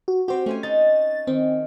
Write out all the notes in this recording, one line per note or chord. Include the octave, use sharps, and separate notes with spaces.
F#4
C4 F#4 G4 C5
A3 C#4 C5 G#5
D#4 A6
D#3 C4